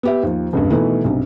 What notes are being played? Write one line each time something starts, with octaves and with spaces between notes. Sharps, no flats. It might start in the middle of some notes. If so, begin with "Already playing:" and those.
B3 G4 E5
D#2 F3
F1 C#2 G2
B2 D#3 E3 A3
B1 G2 C3